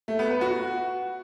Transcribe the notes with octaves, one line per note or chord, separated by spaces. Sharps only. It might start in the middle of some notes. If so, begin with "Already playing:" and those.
A3
B3
B4
F#4